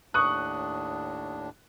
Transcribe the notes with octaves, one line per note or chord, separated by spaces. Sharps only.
D#2 A2 D4 C#6 D#6 F#6